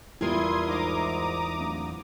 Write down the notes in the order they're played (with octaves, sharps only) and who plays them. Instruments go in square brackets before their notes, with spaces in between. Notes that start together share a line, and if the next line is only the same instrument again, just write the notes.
[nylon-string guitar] E2 G3 A#4 [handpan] E4 F4 [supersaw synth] C6 D#6 G#6
[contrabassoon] G#2 [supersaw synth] A#5 D6 D#6
[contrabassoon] D1